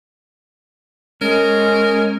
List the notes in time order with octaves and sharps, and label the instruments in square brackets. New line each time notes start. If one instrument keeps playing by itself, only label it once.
[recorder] G#3 [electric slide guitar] C#4 [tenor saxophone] A#4